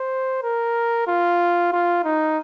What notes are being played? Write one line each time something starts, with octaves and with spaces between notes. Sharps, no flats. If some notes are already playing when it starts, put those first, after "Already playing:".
Already playing: C5
A#4
F4
F4
D#4